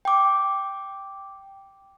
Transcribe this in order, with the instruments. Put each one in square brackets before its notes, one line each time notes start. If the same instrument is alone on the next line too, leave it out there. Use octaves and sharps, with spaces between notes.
[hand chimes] G5 D6